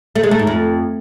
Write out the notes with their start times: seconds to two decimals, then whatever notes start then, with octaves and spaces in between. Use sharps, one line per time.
0.16 A3
0.23 G#3
0.31 A3
0.39 G#2
0.47 F2